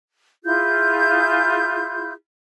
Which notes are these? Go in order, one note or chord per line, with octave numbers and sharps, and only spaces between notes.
E4 F4 G#4 G6